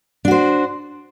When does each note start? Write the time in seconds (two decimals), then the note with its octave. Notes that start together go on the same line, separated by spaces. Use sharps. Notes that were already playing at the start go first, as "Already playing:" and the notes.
0.25 D4
0.28 F#4
0.31 C5